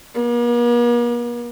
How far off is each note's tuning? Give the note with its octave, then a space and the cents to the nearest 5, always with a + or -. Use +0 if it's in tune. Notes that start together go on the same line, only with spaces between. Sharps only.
A#3 +45